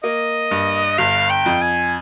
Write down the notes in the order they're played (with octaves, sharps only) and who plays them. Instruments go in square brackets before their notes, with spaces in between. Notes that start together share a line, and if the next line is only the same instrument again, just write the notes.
[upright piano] A#3 [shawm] D#5
[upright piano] G2
[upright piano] G1 [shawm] F5
[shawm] G5
[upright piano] F2
[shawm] G#5